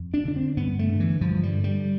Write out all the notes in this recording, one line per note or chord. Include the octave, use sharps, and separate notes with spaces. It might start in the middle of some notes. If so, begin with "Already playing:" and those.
Already playing: F2
D4
D3 D4
C4
G2 B3
A3
D3
E3
G2 F3
G3
D3
G3